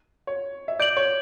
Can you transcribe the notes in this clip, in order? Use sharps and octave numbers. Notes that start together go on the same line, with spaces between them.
C#5
E5
D5 G6 D7 F#7
C#5